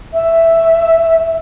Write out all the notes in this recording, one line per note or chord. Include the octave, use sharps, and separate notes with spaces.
E5